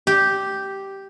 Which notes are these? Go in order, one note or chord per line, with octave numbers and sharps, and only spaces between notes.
G4